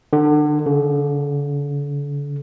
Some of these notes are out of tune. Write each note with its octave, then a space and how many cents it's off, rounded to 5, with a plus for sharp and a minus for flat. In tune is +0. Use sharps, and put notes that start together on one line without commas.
D3 +30
D3 -40